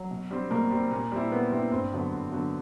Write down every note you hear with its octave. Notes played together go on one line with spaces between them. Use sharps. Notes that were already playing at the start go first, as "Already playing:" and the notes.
Already playing: F#3
B2
G3 C4
B2 A#3
G3 C4
A#2
G3 C4 E4
A#2 B3
G3 C4 E4
G2 C4
D3 F#3 B3
G2
D3 F#3 B3